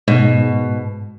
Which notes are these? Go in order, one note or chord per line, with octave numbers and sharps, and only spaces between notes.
G#2 B2